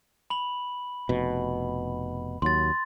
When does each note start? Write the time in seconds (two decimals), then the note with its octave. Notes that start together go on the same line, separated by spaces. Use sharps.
0.30 B5 F#7
1.09 F1 B2
2.42 D#2 F#3 C6 A6